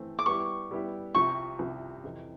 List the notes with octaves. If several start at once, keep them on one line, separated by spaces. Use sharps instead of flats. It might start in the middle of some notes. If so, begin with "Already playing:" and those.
Already playing: E3 A3 C4
D6
G3 B3 E4 G4 C#6
G3 B3 E4 G4
C2 C3 F3 C#6
C2 C3 F3
F2 C3 E3